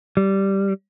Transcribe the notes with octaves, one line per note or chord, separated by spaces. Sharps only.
G3